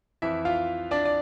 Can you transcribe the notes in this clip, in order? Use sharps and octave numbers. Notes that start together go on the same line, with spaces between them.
F2 E3 E4 E5
F4 F5
D4 D5
D5